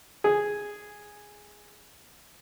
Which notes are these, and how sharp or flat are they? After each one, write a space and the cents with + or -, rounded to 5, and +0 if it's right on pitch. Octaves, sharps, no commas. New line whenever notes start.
G#4 -5